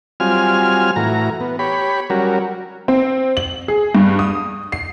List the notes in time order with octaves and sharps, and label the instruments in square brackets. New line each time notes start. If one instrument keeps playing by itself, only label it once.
[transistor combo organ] F#3 G3 C4 F4 G#5 F6
A2 E3 F#4 A#5
B3
G4 C#5 B5
F#3 G3 C#4 F#4 A#4
[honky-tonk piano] C4
F#7
G#4
G2
D#6
C7